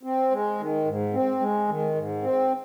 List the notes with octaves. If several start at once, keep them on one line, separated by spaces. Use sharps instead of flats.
C4
G#3
D#3
G#2
C4
G#3
D#3
G#2
C4